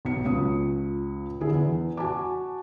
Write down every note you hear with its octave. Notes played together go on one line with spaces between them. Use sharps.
B1 C#7
C#2 C#4 F4 D#6
D3 E4 G#4
E2
F#4 G#5 A5 D6